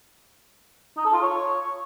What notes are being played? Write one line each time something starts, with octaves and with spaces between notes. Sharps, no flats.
D#4
A4
F4
C#5